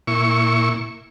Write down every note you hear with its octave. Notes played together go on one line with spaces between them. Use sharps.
A#2 E4 C#6